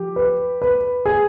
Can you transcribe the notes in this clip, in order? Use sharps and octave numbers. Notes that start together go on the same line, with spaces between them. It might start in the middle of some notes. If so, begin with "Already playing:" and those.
Already playing: F3 G4
B4
B4
G#4